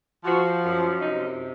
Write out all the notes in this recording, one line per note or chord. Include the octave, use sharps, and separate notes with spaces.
F3 F#4
F#2
C3 D#4